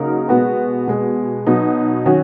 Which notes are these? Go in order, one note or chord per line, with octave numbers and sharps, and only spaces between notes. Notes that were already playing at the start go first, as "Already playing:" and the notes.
Already playing: C#3 F#3 A#3 D#4 A#4
B2 G#3 B3 F#4 B4
B2 G#3 B3
B2 F#3 B3 D#4
D#3 F#3 C#4 F#4